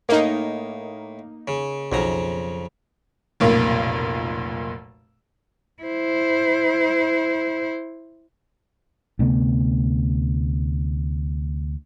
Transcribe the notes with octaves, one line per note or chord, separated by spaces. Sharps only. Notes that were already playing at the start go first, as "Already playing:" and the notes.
A2 A#3 D#4
C#3
B1 F2 C#3 A#5
F1 B1 A#2 A#3
E4 C5
D2 C3 A3 B3